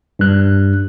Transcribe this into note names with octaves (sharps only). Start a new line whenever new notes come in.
G2 F#6